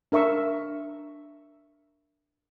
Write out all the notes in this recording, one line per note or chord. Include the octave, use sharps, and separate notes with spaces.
D4 A#4 E5 C#6 E6